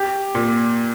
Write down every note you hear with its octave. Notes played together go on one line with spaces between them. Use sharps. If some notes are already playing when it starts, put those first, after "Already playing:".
Already playing: G4
A#2